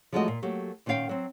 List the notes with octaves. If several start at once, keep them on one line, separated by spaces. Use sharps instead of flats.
F3 F#3 G#3 A3 F#4 D#5
A#2
F#3 A3 A#3 G4
A#2 D#3 C#4 D4 F5 G5
F#3 C4